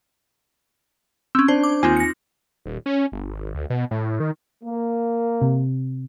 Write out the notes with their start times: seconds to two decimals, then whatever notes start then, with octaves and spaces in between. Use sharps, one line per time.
1.35 C4 C#4 E6
1.48 D4 C5
1.63 D6
1.83 D#2 C4 D#4 F4 G#5
1.96 A#6 C#7
2.66 D#1
2.86 C#4
3.12 G1
3.29 G#1
3.55 D2
3.70 B2
3.91 A2
4.20 D#3
4.64 A#3
5.41 C3